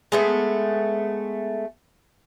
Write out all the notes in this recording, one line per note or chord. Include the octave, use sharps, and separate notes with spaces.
G#3 A3 B3